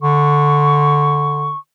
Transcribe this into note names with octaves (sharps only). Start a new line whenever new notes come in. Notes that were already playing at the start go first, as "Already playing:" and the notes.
D3 C#6